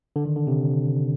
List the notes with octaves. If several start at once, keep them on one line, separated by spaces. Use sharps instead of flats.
D3
D#3
D3
C3